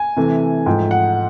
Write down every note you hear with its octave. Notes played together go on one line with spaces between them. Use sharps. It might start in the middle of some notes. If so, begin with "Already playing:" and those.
Already playing: G#5
C3 E3 A3
G#2 F3 A3 G5
F#5